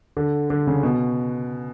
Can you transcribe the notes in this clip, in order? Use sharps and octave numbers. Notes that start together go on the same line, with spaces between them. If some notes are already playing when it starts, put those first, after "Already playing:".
D3
D3
C#3
B2